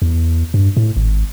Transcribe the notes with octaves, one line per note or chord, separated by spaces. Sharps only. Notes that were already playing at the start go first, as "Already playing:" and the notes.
E2
G2
A2
G#1